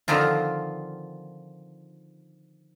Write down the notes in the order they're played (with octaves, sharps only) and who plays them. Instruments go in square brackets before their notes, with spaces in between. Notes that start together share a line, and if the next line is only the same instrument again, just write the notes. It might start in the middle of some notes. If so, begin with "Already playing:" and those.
[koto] D3 D#3 F3 C4 F4